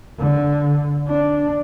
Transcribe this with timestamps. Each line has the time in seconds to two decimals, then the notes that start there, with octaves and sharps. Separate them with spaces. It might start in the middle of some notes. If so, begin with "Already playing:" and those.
0.19 D3
1.07 D4